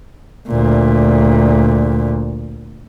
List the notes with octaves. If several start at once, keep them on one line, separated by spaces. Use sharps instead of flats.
D2 A#2